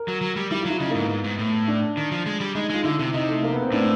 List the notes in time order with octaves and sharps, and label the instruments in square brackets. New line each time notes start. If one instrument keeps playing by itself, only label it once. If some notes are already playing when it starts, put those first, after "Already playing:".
Already playing: [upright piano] A#4
[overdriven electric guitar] F#3
F#3
G3
[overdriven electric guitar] G3 [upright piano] E4
[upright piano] F4
[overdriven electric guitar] F#3 [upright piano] E4
[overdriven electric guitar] C#3 [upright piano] D#4
[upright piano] A#3
[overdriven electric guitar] G#2 [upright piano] B3
[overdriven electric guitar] G#2
G#2
A2
[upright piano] D4
[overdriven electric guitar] D#3
F3
G#3
G3
[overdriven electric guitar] G#3 [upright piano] D#4
[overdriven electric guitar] G#3 [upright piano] F4
[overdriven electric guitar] D3 [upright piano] E4
[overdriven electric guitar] C3
[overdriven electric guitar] C3 [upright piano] D#4
[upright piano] A3
A#3
B3
C4
[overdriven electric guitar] A2 [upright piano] D4